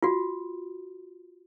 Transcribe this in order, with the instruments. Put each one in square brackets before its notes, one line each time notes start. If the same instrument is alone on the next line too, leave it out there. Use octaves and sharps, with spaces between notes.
[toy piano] F4 F#4